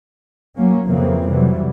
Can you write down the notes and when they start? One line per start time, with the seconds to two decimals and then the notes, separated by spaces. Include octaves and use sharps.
0.55 F#3 A#3 C#4
0.87 F2 C#3 E3 F3 A#3 C4
1.29 C3 E3 F#3 G3